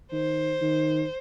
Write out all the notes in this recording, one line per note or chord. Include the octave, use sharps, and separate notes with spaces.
D#3 C5
D#3